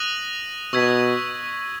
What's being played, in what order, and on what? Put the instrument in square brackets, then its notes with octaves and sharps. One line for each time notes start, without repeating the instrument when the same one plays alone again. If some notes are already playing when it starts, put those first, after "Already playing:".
Already playing: [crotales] D#6 F#6 A#6 D#7 F#7
[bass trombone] B2 [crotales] C#6 E6 G#6 B6